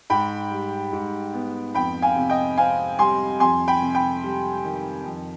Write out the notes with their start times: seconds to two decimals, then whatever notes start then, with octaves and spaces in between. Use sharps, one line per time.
0.10 G#2 G5 B5
0.51 G3
0.93 G#2
1.34 B3
1.75 F2 G5 B5
2.02 F5 G#5
2.16 C3
2.30 D#5 G5
2.57 C4 F5 G#5
2.98 G3 G#5 C6
3.40 F2 G#5 C6
3.68 G5 B5
3.82 C3
3.95 G5 B5
4.23 G3
4.64 D#3
5.05 F2